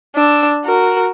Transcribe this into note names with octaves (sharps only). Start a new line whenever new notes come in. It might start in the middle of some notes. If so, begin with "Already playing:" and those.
D4 E6
F#4 A#4